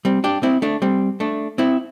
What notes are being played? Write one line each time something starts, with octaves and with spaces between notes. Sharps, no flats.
G3 C4
D4 G4
C4 E4
A3 D4
G3 C4
A3 D4
C4 E4